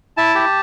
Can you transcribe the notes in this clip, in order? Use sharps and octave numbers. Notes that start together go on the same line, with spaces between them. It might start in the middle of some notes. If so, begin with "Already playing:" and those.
E4 A5
G4